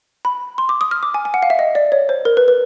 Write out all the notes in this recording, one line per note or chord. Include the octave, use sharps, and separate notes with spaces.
B5
C6
D6
D#6
F6
D6
G#5
G#5
F#5
F5
E5
D#5
D5
C#5
C5
A#4
B4
B4